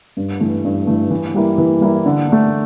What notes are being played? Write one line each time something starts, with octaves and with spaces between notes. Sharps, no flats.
G2
E3 A3
G2
E3 A3
E3
G3 A#3 E4
E3
G3 A#3 E4
D3
A3 D4